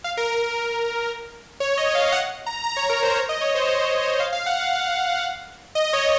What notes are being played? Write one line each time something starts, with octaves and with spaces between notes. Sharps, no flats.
F5
A#4
A#4
C#5
D#5
F5
F5
F#5
A#5
A#5
C#5
A#4
C5
C#5
D#5
C#5
C5
C5
C5
D#5
F5
F5
F#5
D#5
C#5